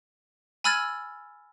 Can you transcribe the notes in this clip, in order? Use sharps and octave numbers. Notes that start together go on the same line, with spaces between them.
G#5 B5 E6 F6 G#6 A6